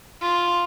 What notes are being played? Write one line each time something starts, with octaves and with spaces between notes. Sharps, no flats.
F4